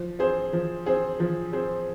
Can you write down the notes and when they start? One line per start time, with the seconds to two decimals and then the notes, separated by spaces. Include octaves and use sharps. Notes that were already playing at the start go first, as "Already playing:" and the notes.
Already playing: F3
0.19 C4 G#4 C5
0.53 F3
0.86 C4 G#4 C5
1.20 F3
1.53 C4 G#4 C5